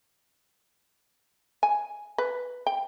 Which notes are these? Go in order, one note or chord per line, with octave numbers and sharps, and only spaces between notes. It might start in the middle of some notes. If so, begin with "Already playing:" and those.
G#5
B4
G5